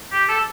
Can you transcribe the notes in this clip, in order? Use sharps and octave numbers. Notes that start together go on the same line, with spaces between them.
G4
A4